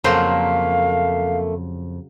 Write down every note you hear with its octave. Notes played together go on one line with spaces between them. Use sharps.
F2 C#3 F#3 A3 A#3 C5 F5